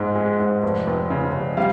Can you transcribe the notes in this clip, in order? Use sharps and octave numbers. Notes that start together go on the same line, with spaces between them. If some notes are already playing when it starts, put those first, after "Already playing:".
Already playing: G#2 G#3
G#3
G#2
F1
F1
C#3
F1
G3 F5